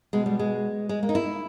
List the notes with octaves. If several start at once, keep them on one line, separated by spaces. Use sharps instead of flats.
B2 G#3
G3
G#3
G#3
A#3
D#4
E4